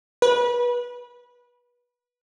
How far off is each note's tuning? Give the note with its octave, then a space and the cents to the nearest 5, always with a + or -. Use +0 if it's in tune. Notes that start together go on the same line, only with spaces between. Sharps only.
B4 -25